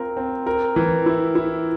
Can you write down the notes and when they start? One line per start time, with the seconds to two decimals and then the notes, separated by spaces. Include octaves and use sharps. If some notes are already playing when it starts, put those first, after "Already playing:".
Already playing: C4 F4 A#4
0.17 C4
0.46 A#4
0.76 E3
1.06 E4
1.35 E4